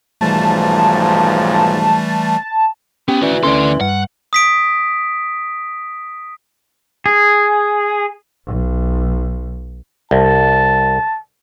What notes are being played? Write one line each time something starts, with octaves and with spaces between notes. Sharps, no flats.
B1 G#2 E3 F3 G3 A3 A5
B3 C#4 G4
E3 F#4 D5
D2 C#4 A4 D5 C6
G2 F#5
D#6 B6 D7
G#4
B1
C2 A5